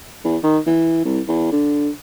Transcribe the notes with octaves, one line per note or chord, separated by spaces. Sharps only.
E2
D#3
E3
C2
E2
D3